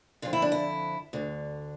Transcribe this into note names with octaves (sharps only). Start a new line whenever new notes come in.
F2 D3 F4
E4
D4
E4
D2 D3